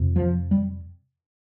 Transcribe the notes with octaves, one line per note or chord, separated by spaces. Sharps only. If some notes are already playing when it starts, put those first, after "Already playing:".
Already playing: F2 C3
F3
G3